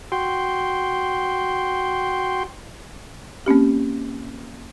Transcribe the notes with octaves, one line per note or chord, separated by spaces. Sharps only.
F#4 G5 C6
A#3 C4 C#4 G4